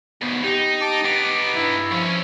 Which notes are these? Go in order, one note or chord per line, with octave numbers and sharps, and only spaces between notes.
D2 G#2 B3
D#4 G4
A5 D6
B3 D#4 D6
G2 E4
G2 F3 C#4